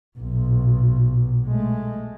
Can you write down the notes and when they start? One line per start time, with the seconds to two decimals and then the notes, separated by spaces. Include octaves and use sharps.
0.19 B1 A#2
1.47 G#3 A3